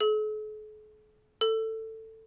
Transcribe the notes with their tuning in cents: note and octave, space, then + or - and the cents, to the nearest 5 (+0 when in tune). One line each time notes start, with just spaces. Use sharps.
A4 -45
A4 +15